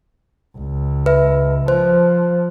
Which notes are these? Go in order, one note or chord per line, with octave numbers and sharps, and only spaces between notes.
C#2
B4 E5
F3 C5